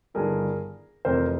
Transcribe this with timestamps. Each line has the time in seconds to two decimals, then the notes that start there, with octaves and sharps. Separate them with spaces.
0.14 G1 G2 D#3 G#4 A#4
1.05 F1 F2 C3 E3 A#4 C5